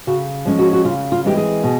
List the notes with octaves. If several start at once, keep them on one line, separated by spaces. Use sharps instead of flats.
C#3 F#4
F3 G#3 C#4
F#4
F#4
C#3 F4
F4
E3 G#3 C4 G4
G#4
B2